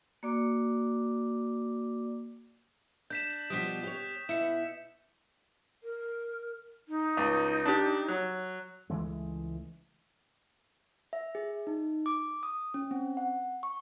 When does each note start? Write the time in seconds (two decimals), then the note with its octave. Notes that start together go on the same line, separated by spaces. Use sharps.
0.23 A#3 F#4 D5 D6
3.10 D4 G6 B6 E7
3.50 B2 F3 G3 D#6 F#6 B6
3.83 G4 C#5
4.29 B2 E4 C#7 E7
5.83 A#4
6.88 D#4
7.17 C#2
7.66 D4 G4
8.08 F#3
8.90 C#2 E3 G#3 A3
11.13 E5
11.35 G#4
11.67 D#4
12.06 D6
12.43 D#6
12.74 C#4
12.91 C4
13.17 F#5
13.63 C#6